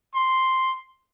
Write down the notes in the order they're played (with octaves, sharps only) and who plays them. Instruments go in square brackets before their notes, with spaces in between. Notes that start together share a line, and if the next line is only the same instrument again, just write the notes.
[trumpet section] C6